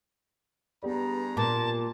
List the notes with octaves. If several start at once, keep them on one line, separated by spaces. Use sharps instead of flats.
G2 B3 G4 G#4 D5 A#5
A#2 A5